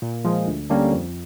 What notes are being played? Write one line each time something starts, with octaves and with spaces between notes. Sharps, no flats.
A#2
F3 G#3
D2
D3 G3 A#3 C#4
F2